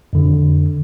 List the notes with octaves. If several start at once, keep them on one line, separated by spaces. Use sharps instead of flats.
F2 D3